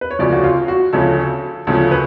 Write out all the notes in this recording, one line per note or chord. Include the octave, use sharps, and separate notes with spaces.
B4
C#5
D2 C#3 F3 D5
F#4
F4
F#4
D2 C#3 F3 A4
D2 C#3 F3 A4
B4